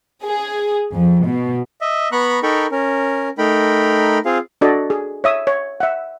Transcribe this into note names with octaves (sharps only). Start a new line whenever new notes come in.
G#4
F2
B2
D#5 E5
B3 A#5 B5 C#6 F#6
D#4 A4 A#4 G5 B5 C#6
C#4 A#4
A3 D#4 A#4 G5 B5
C4 F4 G#4 F5
D4 F#4 A4 D5 D#5
G#4
C#5 E5 D#6
C#5
E5 F#5